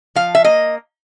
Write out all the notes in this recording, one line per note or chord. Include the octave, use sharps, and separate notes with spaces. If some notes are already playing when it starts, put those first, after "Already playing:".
F3 F5
E5
A#3 D#5